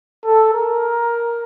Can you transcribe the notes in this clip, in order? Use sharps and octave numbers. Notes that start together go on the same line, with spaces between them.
A4
A#4